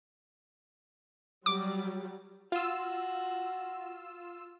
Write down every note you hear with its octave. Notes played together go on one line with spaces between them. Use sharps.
F#3 G3 D6
F4 F#4 E6